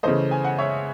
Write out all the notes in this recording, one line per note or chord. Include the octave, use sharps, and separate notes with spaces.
C#3 E3 A3 C5 D#5
G#5
F#5
C#5 E5